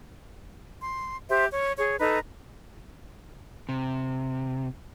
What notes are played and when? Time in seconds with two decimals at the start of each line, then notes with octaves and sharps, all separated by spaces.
0.82 C6
1.29 G4 C5 E5
1.52 C#5
1.78 G#4 C#5
1.99 D#4 A4 B4 A#5
3.69 C3